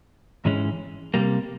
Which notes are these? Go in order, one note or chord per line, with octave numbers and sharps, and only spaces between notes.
G#2 E3 G#3 C#4
C3 D#3 G3 A#3